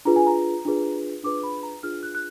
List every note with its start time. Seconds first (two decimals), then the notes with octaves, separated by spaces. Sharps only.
0.05 D4 F4 G#4 B4 A#5
0.16 G#5
0.27 A#5
0.65 D4 F4 G#4 B4
1.23 D4 F4 G#4 B4 D6
1.43 B5
1.63 A#5
1.83 D4 F4 G#4 B4 F6
2.03 F#6
2.15 F#6